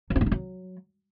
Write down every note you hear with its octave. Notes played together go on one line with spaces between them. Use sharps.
F#3
C4
B3
D#4
F#3